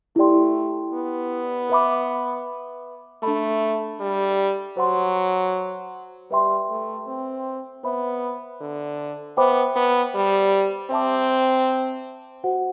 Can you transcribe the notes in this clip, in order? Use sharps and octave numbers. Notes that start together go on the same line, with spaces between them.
A3 E4 G4 D5 G5 C6
B3
B4 E5 B5 D6
A3 D4 A4 E5 B5
G3
F#3 C5 F#5 C6
G3 B4 E5 G5 C6
A3
C4
B3 C5 E5 B5
D3
B3 C5 E5 G5 B5 D6
B3
G3
C4 C5 E5 A5 D6
F#4 C5 F#5